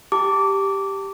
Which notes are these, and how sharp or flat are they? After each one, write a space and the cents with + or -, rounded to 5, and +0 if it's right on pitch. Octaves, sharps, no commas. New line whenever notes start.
G4 +0 A5 +35 D6 -15